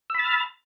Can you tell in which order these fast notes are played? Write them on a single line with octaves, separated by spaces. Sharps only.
E6 B5 A6 F6